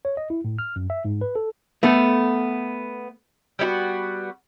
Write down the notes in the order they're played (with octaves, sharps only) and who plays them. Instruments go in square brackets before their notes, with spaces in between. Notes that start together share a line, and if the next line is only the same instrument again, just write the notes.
[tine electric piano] C#5
D#5
E4
A2
F6
F#2
E5
G#2
B4
A4
[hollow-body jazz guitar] A3 B3 A4
[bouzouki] G3 B3 D#4 F#4